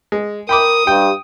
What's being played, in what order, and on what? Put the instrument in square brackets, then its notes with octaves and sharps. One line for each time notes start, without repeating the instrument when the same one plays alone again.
[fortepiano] G#3
[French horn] A#4 [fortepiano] G5 B5 D6 [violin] D#6
[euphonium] G2 [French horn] G4 [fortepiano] G5